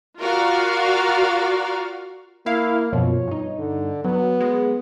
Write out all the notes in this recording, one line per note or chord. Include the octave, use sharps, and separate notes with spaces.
F4 F#4 A#4 D5 F5
A#3 E4 F5
F#2 B2 F3 C#5
G2 D#4
D3
F#3 B3
G#3